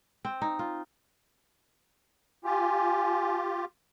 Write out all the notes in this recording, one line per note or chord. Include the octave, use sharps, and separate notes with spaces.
C4
D#4
F4
F4 G4 G#5